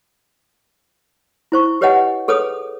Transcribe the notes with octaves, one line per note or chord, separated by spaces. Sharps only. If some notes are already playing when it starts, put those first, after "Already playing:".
E4 C5 C#6
G4 B4 C#5 D#5 F#5 G#5
G#4 A4 B4 C#5 D#6